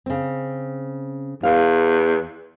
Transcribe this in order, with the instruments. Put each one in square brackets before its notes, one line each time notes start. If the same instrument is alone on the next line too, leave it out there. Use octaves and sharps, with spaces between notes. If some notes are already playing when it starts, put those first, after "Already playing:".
[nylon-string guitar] C#3 C4
[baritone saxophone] E2 [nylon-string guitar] F5